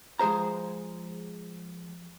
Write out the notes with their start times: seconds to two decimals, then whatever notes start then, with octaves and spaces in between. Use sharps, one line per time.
0.19 F3 G#3 G#4 C5 A#5